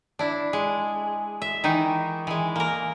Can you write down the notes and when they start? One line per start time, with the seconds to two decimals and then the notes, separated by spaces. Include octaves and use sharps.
0.19 D4 E4
0.53 G#3
1.42 E5
1.64 D#3 E3 D#4
2.27 E3 G#3
2.56 A#3 A#4